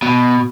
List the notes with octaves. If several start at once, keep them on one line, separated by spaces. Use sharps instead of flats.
B2